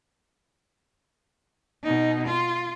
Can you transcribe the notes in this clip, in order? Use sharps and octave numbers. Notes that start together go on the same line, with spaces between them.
B2 D#4
F4